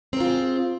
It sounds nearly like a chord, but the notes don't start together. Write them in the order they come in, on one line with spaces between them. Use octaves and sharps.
C4 A#4 F4 G#4